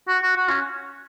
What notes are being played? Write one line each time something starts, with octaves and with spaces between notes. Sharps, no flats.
F#4
F#4
F#4
C#4